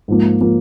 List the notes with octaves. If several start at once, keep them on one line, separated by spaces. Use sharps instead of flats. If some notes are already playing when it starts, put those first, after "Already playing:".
G#2 F3 A#3
F3 A#3